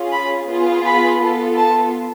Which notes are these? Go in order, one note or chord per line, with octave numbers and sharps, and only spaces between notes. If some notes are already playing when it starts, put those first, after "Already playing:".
Already playing: C#4 F4 G#4
B5
B3 F4 G#4
B5
B3 F4 A4
A5